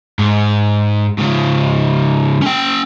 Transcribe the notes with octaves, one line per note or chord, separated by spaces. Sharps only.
G#2
G#2 C#3
C#4 G5